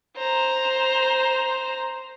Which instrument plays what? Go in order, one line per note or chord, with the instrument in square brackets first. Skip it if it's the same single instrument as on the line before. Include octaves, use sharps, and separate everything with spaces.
[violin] C5 A#5